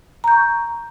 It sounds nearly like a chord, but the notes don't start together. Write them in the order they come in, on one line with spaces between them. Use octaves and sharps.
A#5 G6 C#6